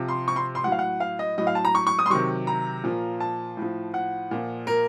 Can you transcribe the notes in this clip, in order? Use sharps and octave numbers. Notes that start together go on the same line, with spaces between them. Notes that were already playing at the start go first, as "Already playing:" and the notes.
Already playing: C3 F3
C6
C#6
C6
C6
A2 F#3 F#5
F5
F#5
F5
D#5
A2 F#3 D#5
F5
A5
A#5
C#6
C#6
D#6
C6
C3 D#3 F#3 C#6
A#5
A#2 F3
A5
A2 F3
F#5
A#2 F3
A#4